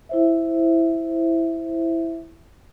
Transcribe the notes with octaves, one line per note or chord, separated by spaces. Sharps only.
E4 C5 E5